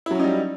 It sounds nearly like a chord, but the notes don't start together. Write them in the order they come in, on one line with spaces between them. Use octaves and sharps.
E4 F#3 C#4 D#4 G3